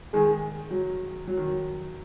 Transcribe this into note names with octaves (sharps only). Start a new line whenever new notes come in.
D#3 G#3 G#4
F#3
F#3
D#3
F#3